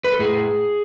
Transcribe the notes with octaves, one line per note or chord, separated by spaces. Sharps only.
B4
A4
A2 G#4